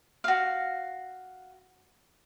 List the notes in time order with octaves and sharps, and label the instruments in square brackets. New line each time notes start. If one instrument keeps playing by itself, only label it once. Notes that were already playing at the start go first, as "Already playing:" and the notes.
[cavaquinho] F#4 F5